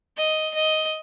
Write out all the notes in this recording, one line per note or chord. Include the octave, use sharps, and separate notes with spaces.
D#5
D#5